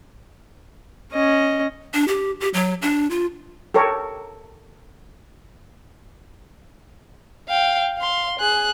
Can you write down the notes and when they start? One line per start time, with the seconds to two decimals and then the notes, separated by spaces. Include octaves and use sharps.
1.12 C#4 D#5
1.94 D4
2.08 G4
2.41 G4
2.54 F#3
2.82 D4
3.10 F4
3.74 G4 A4 A#4 C#5
7.48 F5 G5
7.97 F5 C6
8.39 G#4 F#6